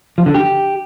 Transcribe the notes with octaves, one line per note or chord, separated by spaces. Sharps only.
F3
D3
G4